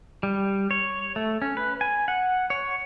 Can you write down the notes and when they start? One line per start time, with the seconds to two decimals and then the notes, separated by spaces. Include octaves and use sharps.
0.23 G3
0.71 C#5
1.16 A3
1.42 C#4
1.57 B4
1.81 G#5
2.08 F#5
2.50 C#5